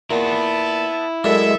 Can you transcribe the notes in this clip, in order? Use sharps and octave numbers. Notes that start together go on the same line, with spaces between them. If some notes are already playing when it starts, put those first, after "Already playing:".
A#2 B3 E4 F#5 A5
F#2 A2 G#3 D4 A4 E5